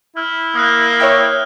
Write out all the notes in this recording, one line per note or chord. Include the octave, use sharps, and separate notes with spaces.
E4 F6
A#3 D#6 F6 F#6
C#5 E5 G5